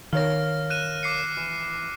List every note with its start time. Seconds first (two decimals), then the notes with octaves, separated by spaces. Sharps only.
0.13 D#3 A#4 C#5 F5 F6 A#6
0.70 F#6 D#7 E7
1.03 D6 C7 C#7
1.37 E3